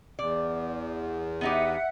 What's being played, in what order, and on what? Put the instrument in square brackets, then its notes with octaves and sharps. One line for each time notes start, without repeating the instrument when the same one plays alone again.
[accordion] E2 [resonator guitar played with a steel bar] D5
[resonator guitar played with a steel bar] B3 D#4 G4 [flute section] E5 F#5